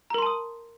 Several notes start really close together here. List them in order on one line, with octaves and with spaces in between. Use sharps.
A#5 A#4 C6 A5 D#6